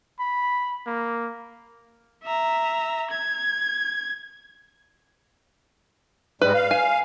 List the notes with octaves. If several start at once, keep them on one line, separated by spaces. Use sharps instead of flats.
B5
A#3
E5 A#5
G#6
G#2 G3 G#3 B4
F5
G#5